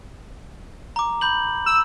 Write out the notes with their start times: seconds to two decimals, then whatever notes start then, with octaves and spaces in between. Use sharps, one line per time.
0.96 A#5 D6
1.21 B5 G6 F#7
1.66 E6